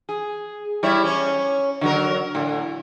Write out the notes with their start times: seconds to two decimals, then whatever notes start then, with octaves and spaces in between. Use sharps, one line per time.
0.09 G#4
0.83 G3 E4 C#5
1.04 C#4 C#5
1.81 D3 F#3 A#4
2.35 A2 D3